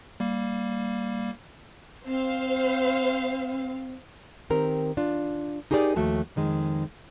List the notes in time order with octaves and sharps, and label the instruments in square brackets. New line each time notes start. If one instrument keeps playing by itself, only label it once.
[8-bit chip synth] G3 A#3
[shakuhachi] C4 [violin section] C5 F5
[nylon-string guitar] D#3 C4 G4 A#4
D4 F4
D#4 G4 G#4 A#4 C5 D5
D#2 F3 A3 F#4 A5
F2 D#3 G#3